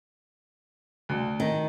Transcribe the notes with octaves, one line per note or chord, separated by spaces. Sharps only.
D2
D#3